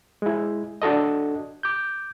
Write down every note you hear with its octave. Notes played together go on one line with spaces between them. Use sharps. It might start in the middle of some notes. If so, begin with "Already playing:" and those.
G#3 E4
D4 F#4 A4 D#5
D6 G6